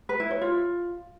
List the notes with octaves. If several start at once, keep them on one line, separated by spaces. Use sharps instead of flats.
B4
E4
C#5
F4